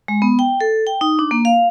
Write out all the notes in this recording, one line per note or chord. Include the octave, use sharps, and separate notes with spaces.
G#3
B3
G5
A4
G5
D#4
D4
A#3
F5